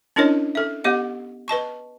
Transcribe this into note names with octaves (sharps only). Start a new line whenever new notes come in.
C#4 D4 E4 A#4 C#5 D#5
A4 E5
B3 G4 D#5 F#5
B4 D#5 A5 C#6